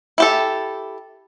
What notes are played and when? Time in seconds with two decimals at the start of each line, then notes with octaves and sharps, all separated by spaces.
0.18 E4 G4 A4